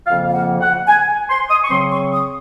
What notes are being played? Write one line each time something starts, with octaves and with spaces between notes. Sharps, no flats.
F2 C#3 F3 A#3 F5
F5
F#5
F#5
G#5
C6
D#6
C#6
C#3 F#3 C4 C6
C#6
D#6